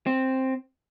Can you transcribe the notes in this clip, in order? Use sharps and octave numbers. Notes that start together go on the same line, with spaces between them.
C4